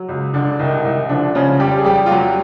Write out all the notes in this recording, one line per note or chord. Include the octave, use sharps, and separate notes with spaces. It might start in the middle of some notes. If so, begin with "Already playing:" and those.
Already playing: F#3
C#2
C#2 D3 D4
C2 D#3 D#4
C2
D3 F3 D4
C#3 F3 C#4
F2 G3 G4
G#4
F2 G3 G4
F4
F#3 G3 F#4